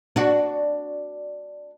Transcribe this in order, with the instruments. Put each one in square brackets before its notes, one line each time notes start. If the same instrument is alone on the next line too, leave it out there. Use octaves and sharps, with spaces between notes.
[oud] D4 F#4